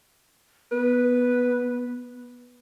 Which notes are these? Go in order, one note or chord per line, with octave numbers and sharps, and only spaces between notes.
B3 B4